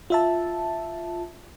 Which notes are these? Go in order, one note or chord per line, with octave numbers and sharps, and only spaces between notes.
F4 E5 A5